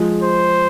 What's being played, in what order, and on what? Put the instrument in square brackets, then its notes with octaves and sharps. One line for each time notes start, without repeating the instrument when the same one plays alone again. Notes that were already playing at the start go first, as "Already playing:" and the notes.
Already playing: [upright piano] F3 G#3
[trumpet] C5